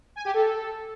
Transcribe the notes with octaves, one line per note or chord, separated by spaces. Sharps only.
G#5
G4
A4